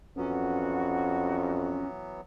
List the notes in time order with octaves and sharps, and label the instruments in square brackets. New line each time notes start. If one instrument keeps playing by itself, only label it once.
[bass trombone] F2 [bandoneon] E3 F#3 B3 [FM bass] C#4 [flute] F#4